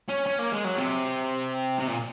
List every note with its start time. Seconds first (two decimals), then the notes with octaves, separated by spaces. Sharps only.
0.09 C#4
0.26 C#4
0.39 A#3
0.52 G#3
0.64 F#3
0.77 C3
1.80 C3
1.88 A#2